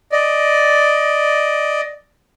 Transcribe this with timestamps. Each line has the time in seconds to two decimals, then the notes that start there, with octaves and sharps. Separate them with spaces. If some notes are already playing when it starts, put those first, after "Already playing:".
0.12 D5 D#5